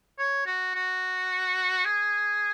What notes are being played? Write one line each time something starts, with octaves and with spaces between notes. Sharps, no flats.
C#5
F#4
F#4
G#4